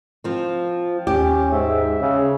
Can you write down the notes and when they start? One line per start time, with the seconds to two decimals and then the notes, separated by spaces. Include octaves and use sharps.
0.24 F3 C4
1.07 D#2 C#4 G4
1.51 G#2 E5
2.01 C#3